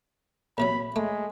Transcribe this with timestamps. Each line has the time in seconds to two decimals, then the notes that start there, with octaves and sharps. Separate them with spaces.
0.58 A#1 C3 F#3 B5
0.96 G#3 A3